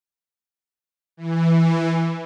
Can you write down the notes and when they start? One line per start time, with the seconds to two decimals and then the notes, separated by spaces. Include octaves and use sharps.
1.17 E3